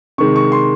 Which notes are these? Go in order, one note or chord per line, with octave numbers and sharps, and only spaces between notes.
C3 D#3 G#3 C#6
C#6
C6